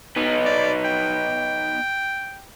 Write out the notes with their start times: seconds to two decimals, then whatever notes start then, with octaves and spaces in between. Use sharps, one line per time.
0.17 B3 D#4
0.45 D5
0.84 G5